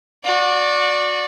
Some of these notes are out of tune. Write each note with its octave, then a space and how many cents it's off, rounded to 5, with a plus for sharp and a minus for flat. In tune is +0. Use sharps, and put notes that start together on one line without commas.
F#4 -25 D5 +0